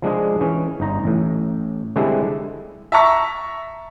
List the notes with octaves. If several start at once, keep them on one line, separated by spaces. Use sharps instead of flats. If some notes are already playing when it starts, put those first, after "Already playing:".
F3 G#3 D4 G#4
E3 C#4
G1 D#4 A#5
A1 A2
D3 G3 G#3 C4 D4 E4
E5 A5 A#5 C#6 B6